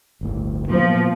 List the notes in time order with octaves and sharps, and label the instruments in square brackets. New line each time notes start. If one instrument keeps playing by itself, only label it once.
[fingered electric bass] G1 D2 A2
[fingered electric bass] A#2 B3 [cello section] F3